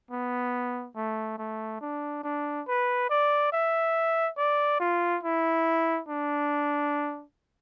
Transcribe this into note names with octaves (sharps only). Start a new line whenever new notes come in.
B3
A3
A3
D4
D4
B4
D5
E5
D5
F4
E4
D4